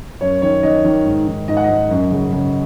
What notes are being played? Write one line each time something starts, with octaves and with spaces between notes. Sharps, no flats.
F#2 C#5
D#3 C#5
D#3 D#5
D#3
G#2
D#3
G#2 D#5
F#5
G#2 D#5
F#2
C#3
C#3